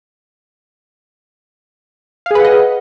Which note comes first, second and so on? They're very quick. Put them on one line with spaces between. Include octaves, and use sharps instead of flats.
F5 G#4 B4 F#5 D#5